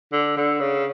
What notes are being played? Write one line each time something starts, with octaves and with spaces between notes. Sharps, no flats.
D3
D3
C#3